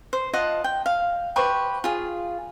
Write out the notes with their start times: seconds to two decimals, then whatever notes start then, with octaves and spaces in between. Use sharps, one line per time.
0.13 C5
0.33 F4 D#5 F#5 A5
0.64 G5
0.86 F5
1.36 G4 B4 C5 C#6
1.84 F4 G#4